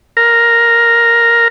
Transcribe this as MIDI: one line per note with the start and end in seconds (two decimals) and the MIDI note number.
0.17 1.48 70